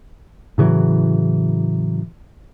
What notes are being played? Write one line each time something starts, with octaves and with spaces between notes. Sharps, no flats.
A2 C#3 E3 F#3